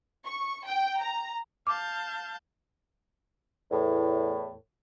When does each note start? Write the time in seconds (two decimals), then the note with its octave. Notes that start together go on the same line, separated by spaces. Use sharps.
0.25 C#6
0.66 G5
0.99 A#5
1.67 F5 A5 D6 G6
3.71 E2 A2